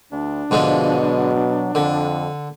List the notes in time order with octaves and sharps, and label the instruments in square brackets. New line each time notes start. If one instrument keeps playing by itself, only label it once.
[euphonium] D2 [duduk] D4
[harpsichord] G#2 D3 G#3 [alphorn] B2 [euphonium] F3
[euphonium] F#3
[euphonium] F2 [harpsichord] D3